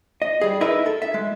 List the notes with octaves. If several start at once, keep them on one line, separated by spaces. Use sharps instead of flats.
D#5
G3 G#4
D#4 E4 A#4 B4 D#5 E5
A4
E5
G#3